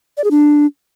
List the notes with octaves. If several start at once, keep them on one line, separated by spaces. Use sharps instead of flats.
D5
G#4
D4